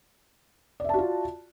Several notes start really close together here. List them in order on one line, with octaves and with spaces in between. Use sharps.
D5 E5 A5 F#4 F4